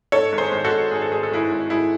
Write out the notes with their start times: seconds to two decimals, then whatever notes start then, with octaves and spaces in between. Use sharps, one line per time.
0.12 G#2 A4 C#5
0.32 G#1
0.38 G#4 C5
0.52 G#1
0.64 F#4 A4
0.72 G#1
0.91 G#1 G#4
1.02 A4
1.11 G#1 G#4
1.23 A4
1.31 G#1 E4 G#4
1.51 G#1
1.70 G#1 E4 G#4